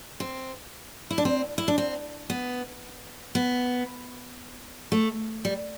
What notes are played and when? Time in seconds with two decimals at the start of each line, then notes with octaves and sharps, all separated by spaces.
0.20 C4
1.11 E4
1.18 D4
1.25 C4
1.58 E4
1.68 D4
1.78 C4
2.30 B3
3.35 B3
4.92 A3
5.45 G3